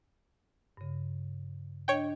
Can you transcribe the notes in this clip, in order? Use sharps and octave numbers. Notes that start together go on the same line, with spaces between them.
G2 C#3
D4 C#5 D#5 G5